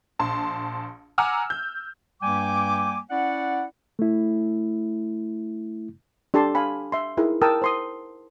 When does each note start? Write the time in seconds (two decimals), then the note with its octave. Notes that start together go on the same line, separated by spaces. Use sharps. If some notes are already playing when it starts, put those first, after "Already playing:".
0.19 A#1 A5 C6
1.18 F#5 G#5 A#5 D6 E6 F6
1.50 G6
2.22 G2 G3 A#3 G5 G#5 D6
3.10 C#4 E4 D5 F#5
3.99 A3 E4
6.34 D4 G4 A4 A5 C6
6.55 F5 G#5 B5
6.92 E5 C6
7.17 D#4 E4 G#4 A#4
7.41 A#4 G5 A5 D#6 E6
7.62 C5 C6 D#6